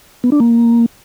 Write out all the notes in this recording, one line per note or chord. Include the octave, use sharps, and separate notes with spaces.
B3
D4
A#3